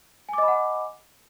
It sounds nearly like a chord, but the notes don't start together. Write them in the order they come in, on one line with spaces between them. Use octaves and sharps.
G#5 D6 D#5 B5 F#5